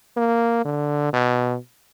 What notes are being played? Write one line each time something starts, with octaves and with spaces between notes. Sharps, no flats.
A#3
D3
B2